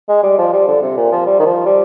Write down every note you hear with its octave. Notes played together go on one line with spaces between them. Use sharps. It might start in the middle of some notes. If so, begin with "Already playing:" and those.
G#3
G3
F3
G3
D3
C3
A#2
F3
G3
D#3
F3
G3